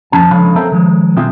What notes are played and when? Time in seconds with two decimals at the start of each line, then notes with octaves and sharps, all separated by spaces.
0.12 F2 F3 C#4 A5
0.31 C#2 D3 F3 C#5 F5 B5
0.56 C4 A4 A#4 E5
0.72 D#3 F3 G#3
1.17 B1 C4 F4 G#4 E5